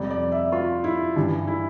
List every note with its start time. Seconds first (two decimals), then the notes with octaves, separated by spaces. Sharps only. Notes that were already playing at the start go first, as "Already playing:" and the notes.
Already playing: F2 C3 G3 D5
0.10 D5
0.32 E5
0.52 F4
0.84 E4
1.16 G2 E3 G3
1.47 E4